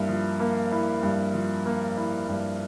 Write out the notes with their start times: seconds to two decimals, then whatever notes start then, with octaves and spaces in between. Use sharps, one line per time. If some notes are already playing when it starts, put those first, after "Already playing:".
Already playing: G2 A#3 E4
0.08 F3
0.40 A#3
0.72 E4
1.03 G2
1.34 F3
1.66 A#3
1.97 E4
2.29 G2